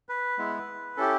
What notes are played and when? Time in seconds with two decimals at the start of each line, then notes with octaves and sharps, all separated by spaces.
0.09 B4
0.38 G#3 B3 E4
0.97 C#4 E4 G4 A4